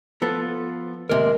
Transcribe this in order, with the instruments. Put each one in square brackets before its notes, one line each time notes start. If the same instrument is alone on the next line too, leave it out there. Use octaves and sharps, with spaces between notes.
[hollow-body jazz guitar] F3 B3 [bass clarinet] A4
[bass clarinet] F4
[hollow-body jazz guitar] D#2 C3 [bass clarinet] G#3 [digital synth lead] A#4